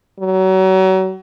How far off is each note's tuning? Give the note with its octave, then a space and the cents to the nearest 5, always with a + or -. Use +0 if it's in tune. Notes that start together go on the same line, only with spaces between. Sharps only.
F#3 +30